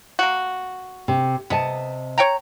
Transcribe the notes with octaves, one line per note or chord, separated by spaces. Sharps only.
A#3 F#4
C3
C3 B3 D#5 A5
C#5 G5 A#5